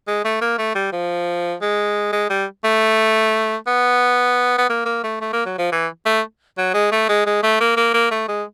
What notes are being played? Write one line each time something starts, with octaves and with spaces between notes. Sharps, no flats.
G#3
A3
A#3
A3
G3
F3
G#3
G#3
G3
A3
B3
B3
A#3
A#3
A3
A3
A#3
F#3
F3
E3
A3
F#3
G#3
A3
G#3
G#3
A3
A#3
A#3
A#3
A3
G#3